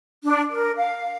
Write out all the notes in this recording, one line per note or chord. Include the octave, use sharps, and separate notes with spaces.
D4
A#4
F5